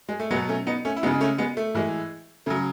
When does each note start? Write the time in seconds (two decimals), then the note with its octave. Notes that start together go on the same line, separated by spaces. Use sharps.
0.09 G#3
0.20 A3
0.31 F#3 G#3 B3
0.35 B2
0.49 A3 C#4
0.67 B3 D#4
0.85 A3 C#4
0.96 E4
1.03 C#3 G#3 B3 D#4
1.21 A3 C#4
1.38 G#3 B3
1.57 A3
1.74 A2 E3 G#3
2.46 C#3 F#3 A3